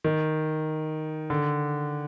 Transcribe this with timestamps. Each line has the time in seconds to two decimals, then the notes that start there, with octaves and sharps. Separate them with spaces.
0.04 D#3
1.30 D3